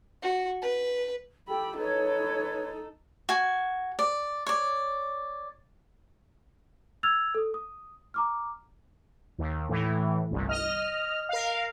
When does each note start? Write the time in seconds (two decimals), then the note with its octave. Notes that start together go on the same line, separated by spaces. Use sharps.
0.22 F#4
0.62 B4
1.48 G4 A4 G5 B5 E6
1.77 D#4 A4 B4 C#5
3.29 F#4 G#5
3.99 D5
4.46 C#5 D5
7.03 E6 F6 G#6 A6 F7
7.35 A4 D#6
7.54 D#6
8.14 A#5 D6 F6
9.38 D#2
9.69 A2 E3
10.31 G1 C2
10.49 D#5 F6
11.29 A#4 F5